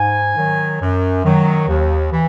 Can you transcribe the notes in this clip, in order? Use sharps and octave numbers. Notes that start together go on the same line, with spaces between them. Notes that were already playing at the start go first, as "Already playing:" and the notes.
Already playing: G#2 G#5
D#3 F#3
F#2
D#3 F#3
D#2
E3